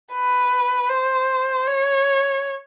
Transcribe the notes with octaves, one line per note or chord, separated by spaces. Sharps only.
B4
C5
C#5